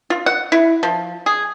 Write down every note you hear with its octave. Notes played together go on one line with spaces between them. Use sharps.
F4
F#5
E4
F3
G#4